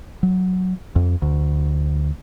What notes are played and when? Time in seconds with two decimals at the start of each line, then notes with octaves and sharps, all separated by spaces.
0.23 F#3
0.96 F2
1.22 D2